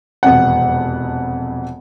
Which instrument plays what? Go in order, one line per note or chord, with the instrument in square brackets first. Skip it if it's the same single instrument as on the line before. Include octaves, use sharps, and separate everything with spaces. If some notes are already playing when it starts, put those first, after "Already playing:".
[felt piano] E1 F2 C3 F#5